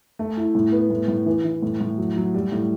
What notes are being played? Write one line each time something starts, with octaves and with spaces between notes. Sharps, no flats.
A3
E4
A2
B3
A2
A2
E3
E3
A2
A2
F#3
F#3
G3
A2